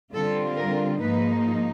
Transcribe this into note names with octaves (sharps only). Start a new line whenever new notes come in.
D3 G3 C4 F4 A4
A#4
G#2 F3 A#3 D#4 B4